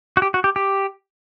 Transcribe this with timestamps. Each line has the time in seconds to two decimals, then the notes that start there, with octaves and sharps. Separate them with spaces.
0.17 F#4
0.22 G4
0.34 F#4
0.44 G4
0.56 G4